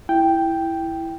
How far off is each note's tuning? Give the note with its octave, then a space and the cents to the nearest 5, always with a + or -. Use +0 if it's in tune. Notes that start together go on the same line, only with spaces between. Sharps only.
E4 +5 G5 +0